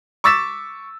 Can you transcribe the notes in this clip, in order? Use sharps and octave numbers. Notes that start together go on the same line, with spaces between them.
C#6 D6 E6 A6 B6 E7